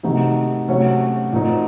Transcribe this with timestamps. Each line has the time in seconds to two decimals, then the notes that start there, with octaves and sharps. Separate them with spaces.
0.03 C3 D#3 A3 D#4 F#4
0.68 C3 F#3 A3 C#4 F#4
1.32 A#2 A3 C4 D#4 F#4